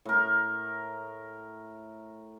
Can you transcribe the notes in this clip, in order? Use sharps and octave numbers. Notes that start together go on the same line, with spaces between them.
A2 A#4